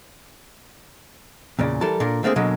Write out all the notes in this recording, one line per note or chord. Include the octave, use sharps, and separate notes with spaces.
E2 A#2 C#3 D5
E3 G3 A4 A#4 A5
A#2 D4 A4 A#4
D3 A3 A#3 C4 G#4
B2 D3 F#3 G#3 A#3